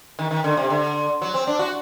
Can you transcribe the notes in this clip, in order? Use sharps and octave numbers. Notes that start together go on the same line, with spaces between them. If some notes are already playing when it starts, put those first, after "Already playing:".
D#3
D#3
D3
C3
D3
F#3
C4
D4
F#4